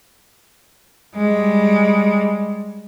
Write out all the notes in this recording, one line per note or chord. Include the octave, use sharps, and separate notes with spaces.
G3 G#3